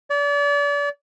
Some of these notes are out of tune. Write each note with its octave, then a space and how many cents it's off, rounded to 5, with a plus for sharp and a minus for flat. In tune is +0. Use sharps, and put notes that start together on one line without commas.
D5 -35